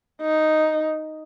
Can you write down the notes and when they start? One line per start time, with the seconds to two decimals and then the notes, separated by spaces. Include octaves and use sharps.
0.21 D#4